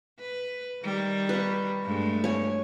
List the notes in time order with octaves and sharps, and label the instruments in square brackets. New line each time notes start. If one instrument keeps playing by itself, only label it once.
[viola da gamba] B4
D#3 G3
[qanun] B4 C#6
[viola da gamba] G2 G#3 A3
[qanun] C#5 G#5